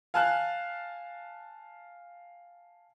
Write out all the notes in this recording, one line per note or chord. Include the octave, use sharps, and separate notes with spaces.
F5 G#5 A5 F6 F#6